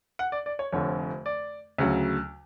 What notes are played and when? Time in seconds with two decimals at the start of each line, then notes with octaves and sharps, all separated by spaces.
0.19 F#5
0.32 D5
0.46 D5
0.59 C#5
0.72 F1 F2 D3 C#5
1.26 D5
1.78 D2 C#3 F#3